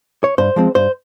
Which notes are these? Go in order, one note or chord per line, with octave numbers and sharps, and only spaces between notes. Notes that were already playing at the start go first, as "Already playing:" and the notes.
C#5
G2 C5
F3 G#3 C4
G2 C5